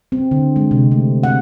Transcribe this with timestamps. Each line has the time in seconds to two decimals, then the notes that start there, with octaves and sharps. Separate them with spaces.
0.12 C4
0.31 D3
0.56 G#3
0.71 C3
0.92 A3
1.23 F#5